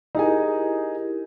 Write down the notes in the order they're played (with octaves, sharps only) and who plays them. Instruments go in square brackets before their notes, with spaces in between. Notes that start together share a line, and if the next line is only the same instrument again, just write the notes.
[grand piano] D#4 G#4 G#5 [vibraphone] E4 G4 A#4